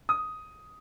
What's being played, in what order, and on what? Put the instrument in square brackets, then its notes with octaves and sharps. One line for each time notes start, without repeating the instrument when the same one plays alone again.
[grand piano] D#6